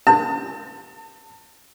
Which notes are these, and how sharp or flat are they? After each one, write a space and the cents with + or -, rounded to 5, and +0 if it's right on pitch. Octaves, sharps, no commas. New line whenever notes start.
A5 +35